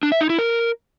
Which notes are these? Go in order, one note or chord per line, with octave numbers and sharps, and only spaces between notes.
D4
E5
D#4
E4
A#4